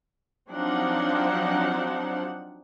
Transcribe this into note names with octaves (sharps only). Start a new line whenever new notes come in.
F3 F#3 C4 D4 D#4 F#5